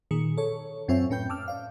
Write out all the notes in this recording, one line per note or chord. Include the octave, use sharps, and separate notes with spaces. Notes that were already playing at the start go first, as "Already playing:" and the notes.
A#2 D#3 G#4 C#7
A4 C#5
F#2 C4 F4 C#5 E5 G#5
A2 C#4 B4 G5 G6
A5 D6 E6 F6
D5 F5